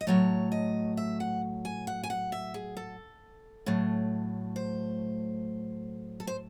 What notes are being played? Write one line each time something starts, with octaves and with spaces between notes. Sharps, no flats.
D#5
A2 F#3 A3 C#5
D#5
E5
F#5
G#5
F#5
G#5
F#5
E5
G#4
A4
A2 F#3 A3
C5
A4
C5